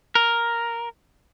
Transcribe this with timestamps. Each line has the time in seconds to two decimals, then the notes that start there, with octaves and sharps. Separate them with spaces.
0.15 A#4